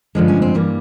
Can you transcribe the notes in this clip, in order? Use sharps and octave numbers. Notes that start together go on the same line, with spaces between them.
G2 D3 F3 G#3
C#4
C4
G2 E3 G3 A#3